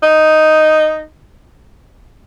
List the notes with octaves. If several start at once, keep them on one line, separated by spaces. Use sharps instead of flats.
D#4